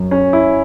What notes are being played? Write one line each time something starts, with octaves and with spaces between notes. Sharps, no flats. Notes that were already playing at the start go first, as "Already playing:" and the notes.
Already playing: F#2 F#3
C#4
E4